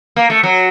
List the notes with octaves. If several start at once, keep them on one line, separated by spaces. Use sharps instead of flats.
A#3
A3
F#3